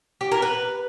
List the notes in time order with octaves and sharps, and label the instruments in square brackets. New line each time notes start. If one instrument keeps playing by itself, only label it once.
[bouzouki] G4
A#4
B4